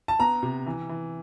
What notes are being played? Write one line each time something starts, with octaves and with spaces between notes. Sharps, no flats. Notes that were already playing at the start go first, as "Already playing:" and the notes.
A5
B3 A#5
C3
E3
E3